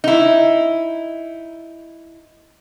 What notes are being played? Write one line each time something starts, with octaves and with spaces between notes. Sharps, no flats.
D#4 E4